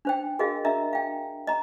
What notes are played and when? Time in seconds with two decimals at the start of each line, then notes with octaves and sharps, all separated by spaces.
0.05 D4 C5 G5
0.39 F#4 G#4 A#4 D#5 F5
0.65 D4 A#4 D#5 E5 A#5
0.93 F5 G5
1.47 D#5 A#5